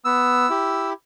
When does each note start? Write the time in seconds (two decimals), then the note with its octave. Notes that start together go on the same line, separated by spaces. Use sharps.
0.05 B3 E6
0.49 E4 G4